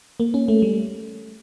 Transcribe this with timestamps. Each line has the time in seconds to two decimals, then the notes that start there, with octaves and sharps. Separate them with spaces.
0.20 A#3
0.34 C#4
0.48 A3
0.62 G3